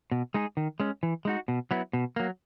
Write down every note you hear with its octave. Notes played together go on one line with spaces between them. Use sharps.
B2
G#3 D#4 G#4
D#3
G#3 C#4
E3
G#3 D#4 F#4
B2
F#3 B3 E4
B2
F#3 A#3